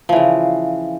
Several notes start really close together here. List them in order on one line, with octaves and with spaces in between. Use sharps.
F3 E3 C#3